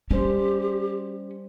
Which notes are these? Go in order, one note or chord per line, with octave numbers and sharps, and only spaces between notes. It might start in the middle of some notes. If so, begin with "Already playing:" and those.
G3 C#4 G4 C5